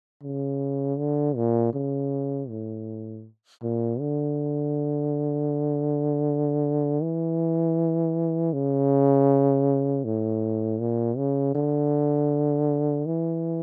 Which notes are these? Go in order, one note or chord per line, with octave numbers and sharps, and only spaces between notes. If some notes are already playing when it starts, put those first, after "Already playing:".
C#3
D3
A#2
C#3
A2
A#2
D3
E3
C#3
A2
A#2
C#3
D3
E3